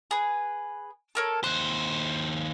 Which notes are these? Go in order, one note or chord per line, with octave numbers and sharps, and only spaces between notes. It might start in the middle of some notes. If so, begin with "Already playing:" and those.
G#4 B4
A4 A#4 C#5
D#2 C5 F#6